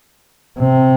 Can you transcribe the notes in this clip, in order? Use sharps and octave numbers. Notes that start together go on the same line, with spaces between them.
C3